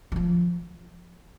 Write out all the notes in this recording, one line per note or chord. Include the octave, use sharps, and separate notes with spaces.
E3
F3